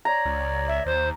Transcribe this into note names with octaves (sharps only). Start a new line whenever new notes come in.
C#5 D5 A#5
C#2
E5
D#2 C5